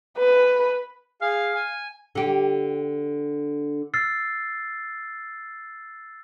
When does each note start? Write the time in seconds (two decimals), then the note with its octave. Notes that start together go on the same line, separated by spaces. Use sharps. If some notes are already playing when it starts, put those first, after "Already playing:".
0.18 B4
1.22 G#4 F5
1.55 G#5
2.15 D3 G4
3.94 E6 F6 A6 C7